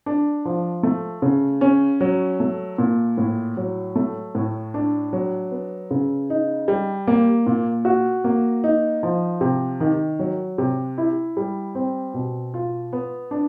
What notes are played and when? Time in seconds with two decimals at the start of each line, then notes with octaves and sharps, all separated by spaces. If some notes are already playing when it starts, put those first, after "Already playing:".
0.06 D4
0.45 F3
0.83 A3
1.22 C#3
1.61 C#4
2.01 F#3
2.40 A3
2.78 A#2
3.18 A2
3.57 F#3
3.96 A3
4.35 A2
4.74 D4
5.13 F#3
5.51 B3
5.91 C#3
6.30 D#4
6.68 G3
7.07 A#3
7.46 A#2
7.85 F#4
8.24 A#3
8.64 D#4
9.03 F3
9.41 C3
9.80 D#3
10.19 F#3
10.58 C3
10.98 E4
11.37 G3
11.75 C4
12.14 B2
12.54 F4
12.93 B3
13.31 D4